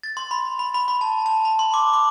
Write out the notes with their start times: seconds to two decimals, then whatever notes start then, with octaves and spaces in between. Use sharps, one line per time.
0.03 A6
0.17 C6
0.31 B5
0.59 B5
0.74 B5
0.88 B5
1.01 A5
1.26 A5
1.45 B5
1.59 C6
1.74 D6
1.93 D6